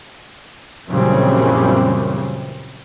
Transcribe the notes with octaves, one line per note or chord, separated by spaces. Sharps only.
A#1 F#2 C#3 E3 G3 C4